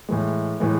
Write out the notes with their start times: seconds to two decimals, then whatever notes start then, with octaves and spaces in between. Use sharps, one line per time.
0.09 A2 E3 G#3
0.60 A2 E3 G#3